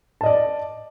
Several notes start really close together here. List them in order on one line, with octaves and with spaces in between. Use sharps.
A5 D#5 D5